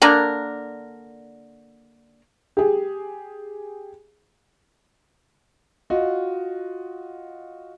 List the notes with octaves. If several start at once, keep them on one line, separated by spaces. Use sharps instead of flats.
D3 A#3 D4 A#4
G4 G#4
F4 F#4 D#5